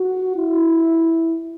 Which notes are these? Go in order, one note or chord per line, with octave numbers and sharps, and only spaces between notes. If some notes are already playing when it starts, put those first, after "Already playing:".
Already playing: F#4
E4